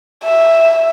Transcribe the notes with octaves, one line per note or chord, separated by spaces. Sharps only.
E5